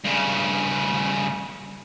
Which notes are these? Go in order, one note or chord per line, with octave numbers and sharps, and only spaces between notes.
G2 C#3